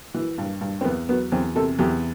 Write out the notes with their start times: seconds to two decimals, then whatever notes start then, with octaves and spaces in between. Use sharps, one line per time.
0.14 E3
0.38 G2
0.61 G2
0.81 C4
0.85 E2 B3
1.09 F#3 B3
1.32 E2 C4
1.56 C3 A4
1.79 E2 G4